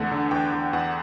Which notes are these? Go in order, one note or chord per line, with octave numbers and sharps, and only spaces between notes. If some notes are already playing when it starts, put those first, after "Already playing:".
Already playing: E2 D3 A3 F#5
D3
E2 G5
E2
E2 F#5